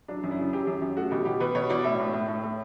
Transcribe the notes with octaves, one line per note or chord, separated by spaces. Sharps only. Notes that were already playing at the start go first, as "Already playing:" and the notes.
F#3 D4
F#2
E4
C#3
F#3 G4
F#2
F#2
A3 F#4
B2 G4
B2 G4
B2 B4
B2 C#5
B2 D5
A2 E5
A2
A2
A2
A2